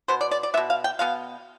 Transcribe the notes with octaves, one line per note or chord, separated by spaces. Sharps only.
B2 B3 C5
D5
D5
D5
B3 E5
B2
F5
G5
B2 B3 F5